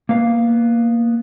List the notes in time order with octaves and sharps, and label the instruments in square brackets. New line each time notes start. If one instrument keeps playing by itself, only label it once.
[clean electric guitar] A#3 B3 F5